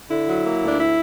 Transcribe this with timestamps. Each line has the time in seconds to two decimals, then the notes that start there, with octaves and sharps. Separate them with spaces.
0.09 D3 E4
0.27 F#3
0.44 A#3
0.62 D2
0.67 D4
0.78 E4